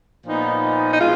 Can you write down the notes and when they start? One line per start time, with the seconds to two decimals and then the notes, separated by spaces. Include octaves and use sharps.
0.25 A#2 F3 B3 D#4
0.92 D#4
0.99 B2 G#3 F4